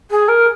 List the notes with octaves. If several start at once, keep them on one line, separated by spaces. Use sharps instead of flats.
G#4
A#4